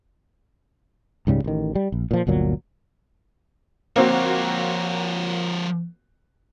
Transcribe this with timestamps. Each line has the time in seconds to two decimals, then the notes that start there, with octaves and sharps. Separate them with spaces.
1.27 C#2 G#2 C#3 G3
1.44 A1 D#3
1.75 G3
1.92 A#1
2.11 A#2 F3
2.27 G1 D2 A#2 F#3
3.96 F3 A#3 C4 F#4 C#5